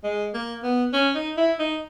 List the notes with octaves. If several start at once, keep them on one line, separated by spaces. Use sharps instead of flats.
G#3
A#3
B3
C#4
D#4
E4
D#4